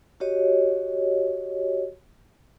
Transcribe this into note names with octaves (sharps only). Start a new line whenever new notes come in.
F#4 G4 C#5 D#5